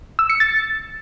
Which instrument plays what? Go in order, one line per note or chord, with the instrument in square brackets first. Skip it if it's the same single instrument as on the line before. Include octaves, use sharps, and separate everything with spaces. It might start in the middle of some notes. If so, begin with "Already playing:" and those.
[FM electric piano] E6
C#7
A6